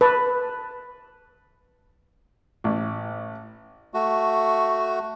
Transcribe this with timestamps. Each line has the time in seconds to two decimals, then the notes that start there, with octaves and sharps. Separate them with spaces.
0.01 B4 A5
2.64 A1
3.94 A3 F#4